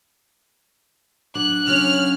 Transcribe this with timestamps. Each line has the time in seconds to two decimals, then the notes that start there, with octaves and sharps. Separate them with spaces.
1.35 F#3 D4 F#6
1.67 C#3 F#3 C#4 F6